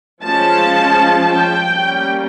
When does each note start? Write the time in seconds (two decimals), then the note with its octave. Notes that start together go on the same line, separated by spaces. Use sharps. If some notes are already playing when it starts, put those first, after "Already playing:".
0.23 F3 G#3 C#4 A5
1.30 G5
1.67 G3 A#3 C#4